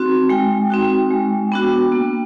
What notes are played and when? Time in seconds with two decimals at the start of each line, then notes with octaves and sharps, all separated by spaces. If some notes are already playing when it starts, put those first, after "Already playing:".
Already playing: C4 D#4 F#4
0.29 G#3 G5
0.70 C4 D#4 F#4
1.10 G#3
1.52 B3 D4 F#4
1.92 A#3